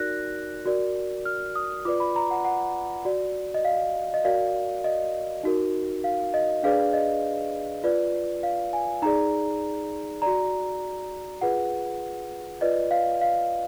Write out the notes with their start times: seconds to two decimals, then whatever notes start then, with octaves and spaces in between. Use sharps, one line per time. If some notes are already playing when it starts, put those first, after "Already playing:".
Already playing: D#4 F#4 A#4 D5 F#6 A#6
0.65 F#4 A#4 D5
1.25 F6
1.56 D#6
1.85 F4 B4 D5 D6
2.00 B5
2.16 A#5
2.31 F#5
2.45 F#5
3.05 F#4 D5
3.54 D#5
3.65 F5
4.14 D#5
4.24 F#4 A#4 D5 F5
4.84 D#5
5.43 D#4 F#4 A#4
6.04 F5
6.34 D#5
6.63 D4 G#4 B4 D5 F5
6.93 D#5
7.84 F4 B4 D5
8.43 F5
8.73 G#5
9.02 D#4 G#4 D5 A#5
10.22 F#4 D5 A#5
11.41 F4 G#4 B4 F#5
12.61 F4 B4 D5 D#5
12.91 F5
13.21 F5